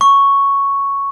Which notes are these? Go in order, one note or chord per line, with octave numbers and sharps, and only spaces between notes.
C#6